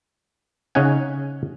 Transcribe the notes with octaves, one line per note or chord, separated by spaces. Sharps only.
C#3 C#4 D#4 F#5 G#5